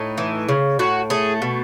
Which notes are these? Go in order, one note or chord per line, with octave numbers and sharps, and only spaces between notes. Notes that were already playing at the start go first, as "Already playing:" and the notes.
Already playing: A2 D#4
E3
C#3
A2 F#4
A3 G#4
B2